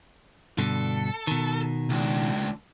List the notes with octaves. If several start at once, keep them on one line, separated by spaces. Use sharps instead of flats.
G2 B2 D3 A4
B2 D#3
C#2 D4